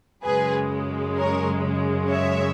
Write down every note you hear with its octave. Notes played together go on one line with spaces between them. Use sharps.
F#2 C#3 G#3 G#4 B4
A#4 C#5
C#5 E5